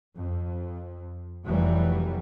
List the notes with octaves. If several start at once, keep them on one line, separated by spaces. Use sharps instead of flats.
F2
F1 E3 F#3 G3